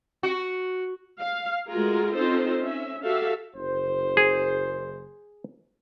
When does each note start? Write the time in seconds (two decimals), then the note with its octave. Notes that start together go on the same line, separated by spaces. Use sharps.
0.23 F#4
1.18 F5
1.68 G#3 A3 F4 F#4 G#4 A#4
2.15 C4 C#4 D#4 F4 A4 C5
2.60 C#4 E5
3.04 F#4 G4 A4 E5 F5
3.55 F#1 C5
4.17 G#4